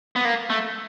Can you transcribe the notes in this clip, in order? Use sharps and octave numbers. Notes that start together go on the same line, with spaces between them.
B3
A#3
A3